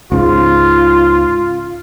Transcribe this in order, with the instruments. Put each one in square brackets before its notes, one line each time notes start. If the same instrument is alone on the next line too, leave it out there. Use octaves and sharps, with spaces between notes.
[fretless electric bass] C#2 G#2 [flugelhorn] F4